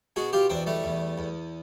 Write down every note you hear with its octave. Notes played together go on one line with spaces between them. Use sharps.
B2 F#4 G#4
F4 G4
E2 C4 D4
G3 A3
E2
E2